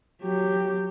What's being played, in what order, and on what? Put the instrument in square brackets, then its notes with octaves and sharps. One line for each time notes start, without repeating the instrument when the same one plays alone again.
[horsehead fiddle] F#3 G4